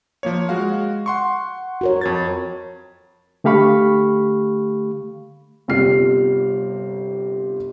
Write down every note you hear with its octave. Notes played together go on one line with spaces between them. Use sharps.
F3 A#3 C#5
G#3 F#4 F5
F#5 C6 C#6
F#4 A#4 C#5
F2 G#6 A6
D3 A3 G4 F5 B5 C#6
G1 C3 G3 F4 F6 C7